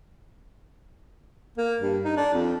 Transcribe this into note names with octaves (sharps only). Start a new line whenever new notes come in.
A#3
G2
D#4
D4
F2